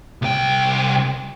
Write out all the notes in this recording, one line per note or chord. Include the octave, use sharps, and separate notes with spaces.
C2 G5